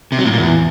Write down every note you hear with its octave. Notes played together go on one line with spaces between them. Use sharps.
C3
F#3
A2
A#2
E2